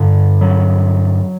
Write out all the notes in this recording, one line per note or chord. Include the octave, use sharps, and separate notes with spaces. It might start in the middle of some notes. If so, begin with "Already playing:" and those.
Already playing: G2 D3
F#3